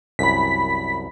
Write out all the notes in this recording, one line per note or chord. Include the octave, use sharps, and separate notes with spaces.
C2 F#2 B5 B6